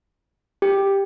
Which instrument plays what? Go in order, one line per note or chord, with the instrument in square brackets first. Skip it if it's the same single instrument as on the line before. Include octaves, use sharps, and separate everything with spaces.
[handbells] G4